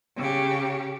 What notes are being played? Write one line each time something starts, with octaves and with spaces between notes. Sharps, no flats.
C#3 G4